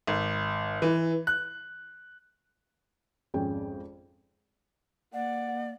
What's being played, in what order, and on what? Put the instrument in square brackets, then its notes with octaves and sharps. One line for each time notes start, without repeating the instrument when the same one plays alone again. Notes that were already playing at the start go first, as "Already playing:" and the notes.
[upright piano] G#1
E3
F#6
[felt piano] G#1 F2 C#4 G#4 G5
[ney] A#3 [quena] D5 [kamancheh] F#5